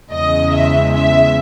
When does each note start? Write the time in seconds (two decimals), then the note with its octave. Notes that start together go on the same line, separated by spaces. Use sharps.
0.12 E2 C#3 G#3 D#5
0.53 E5
0.94 E5